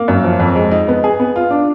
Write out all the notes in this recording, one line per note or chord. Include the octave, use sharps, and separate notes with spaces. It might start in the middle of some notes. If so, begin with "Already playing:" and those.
Already playing: A#3
F#2
F3
F2
G#3
D#4
B3
G#4
B3
F4
D4